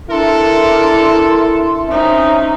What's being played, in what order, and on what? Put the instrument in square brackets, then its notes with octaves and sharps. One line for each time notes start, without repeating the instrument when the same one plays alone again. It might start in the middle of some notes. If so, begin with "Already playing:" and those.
[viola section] D4 A#4 [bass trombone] E4 [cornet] A4 [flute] C6
[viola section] C4 C#4 D#4 [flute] E5